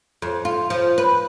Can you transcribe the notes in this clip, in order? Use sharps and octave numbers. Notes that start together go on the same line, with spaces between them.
F2
F4
F3
B4